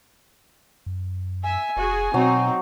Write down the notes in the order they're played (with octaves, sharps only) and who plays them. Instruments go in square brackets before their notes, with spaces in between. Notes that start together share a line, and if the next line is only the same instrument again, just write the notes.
[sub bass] F#2
[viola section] E5 [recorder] G#5
[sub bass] F1 [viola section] F#4 G#4
[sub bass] B2 [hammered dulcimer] F#3 [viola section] C4 D#4